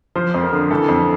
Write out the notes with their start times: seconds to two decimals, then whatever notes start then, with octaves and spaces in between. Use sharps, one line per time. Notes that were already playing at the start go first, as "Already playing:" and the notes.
0.16 F3 C5
0.34 F2
0.43 A#4
0.52 D3
0.71 E3 A4
0.88 F2